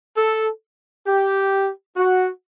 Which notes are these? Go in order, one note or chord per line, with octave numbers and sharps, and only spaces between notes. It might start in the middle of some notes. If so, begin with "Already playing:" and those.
A4
G4
F#4